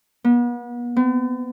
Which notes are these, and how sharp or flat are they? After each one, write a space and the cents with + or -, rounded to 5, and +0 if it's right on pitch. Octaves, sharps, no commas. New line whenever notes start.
B3 -40
B3 +45